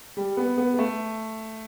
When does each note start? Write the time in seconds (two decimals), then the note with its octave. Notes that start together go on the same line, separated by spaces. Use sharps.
0.17 G3
0.37 B3
0.58 B3
0.74 B3
0.79 A3